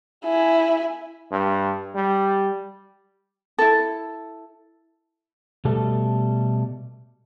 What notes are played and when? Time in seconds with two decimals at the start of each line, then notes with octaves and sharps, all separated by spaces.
0.25 E4 G#5
1.32 G2
1.96 G3
3.58 E4 A4
5.65 B2 G3 A3 A4